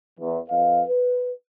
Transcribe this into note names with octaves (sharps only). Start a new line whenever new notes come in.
E2
F2 B4 D#5 F5
B4